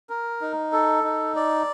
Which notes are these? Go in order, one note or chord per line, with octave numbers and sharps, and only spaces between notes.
A#4
D#4
A4
D#4
D5